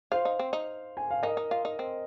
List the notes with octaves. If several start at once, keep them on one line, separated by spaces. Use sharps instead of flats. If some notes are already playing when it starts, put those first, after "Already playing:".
F4 C5 F5
D#4
C4
D#4
G#5
F5
D#4 A#4 D#5
D#4
F4
D#4
C4